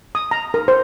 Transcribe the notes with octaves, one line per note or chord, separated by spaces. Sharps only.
D#6
A#5
A#4
C5